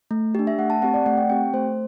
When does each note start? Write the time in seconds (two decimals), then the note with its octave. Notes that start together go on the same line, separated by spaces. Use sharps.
0.11 A3
0.35 D4 G4
0.47 E5
0.59 A3 F#5
0.70 A5
0.82 C4 G4 F#5
0.94 D5
1.06 A3 F#5
1.18 G5
1.29 C4 G4 G5
1.53 A3 C5